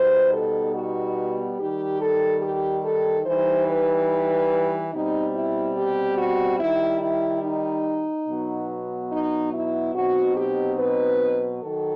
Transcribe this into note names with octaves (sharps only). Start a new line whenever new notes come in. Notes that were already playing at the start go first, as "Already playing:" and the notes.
Already playing: B2 G3 B3 D#4 C5
A4
F#4
D#3 G3 D#4 G4
A4
G4
A4
E3 G3 D#4 C5
B4
B2 G3 C4 D#4
E4
G4
F#4
D#3 G3 D#4 E4
E4
D#4
B2 F#3 B3
D#4
E4
B2 F#3 C4 D#4 F#4
G4
B4
D#3 F#3 A4